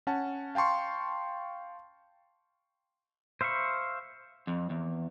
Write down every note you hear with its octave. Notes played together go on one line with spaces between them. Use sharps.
C#4 F#5 A5
F5 G5 A5 C6 C#6
C5 E5 F5 B5 C#6
F2
E2